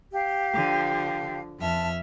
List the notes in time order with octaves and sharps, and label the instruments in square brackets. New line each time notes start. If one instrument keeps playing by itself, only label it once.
[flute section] G4 F5
[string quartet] D3 F3
[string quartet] F2 E5 F6 [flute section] A5